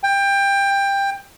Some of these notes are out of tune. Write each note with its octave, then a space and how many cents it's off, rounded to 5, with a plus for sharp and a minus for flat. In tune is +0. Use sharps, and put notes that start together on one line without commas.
G5 +20